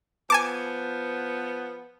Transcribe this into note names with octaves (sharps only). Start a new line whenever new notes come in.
F3 B3 G#5 A5 D6